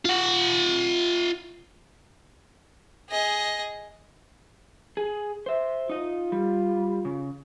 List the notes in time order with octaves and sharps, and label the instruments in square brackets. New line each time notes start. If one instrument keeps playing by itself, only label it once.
[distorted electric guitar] F4 F#5
[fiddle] G#4 D#5
[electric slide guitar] G#4
C5 E5
[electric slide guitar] D#4 D#5 [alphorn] F4
[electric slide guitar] G3
C#3